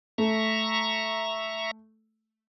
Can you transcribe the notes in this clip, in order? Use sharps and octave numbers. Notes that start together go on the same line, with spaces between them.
A3 E5 A#5 C#6